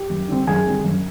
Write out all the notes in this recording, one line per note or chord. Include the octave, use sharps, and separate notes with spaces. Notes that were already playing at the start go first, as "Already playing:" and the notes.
Already playing: G4
F#2
D3 G3 C4
F#2 G#4 G#5
D3 G3 C4
F#2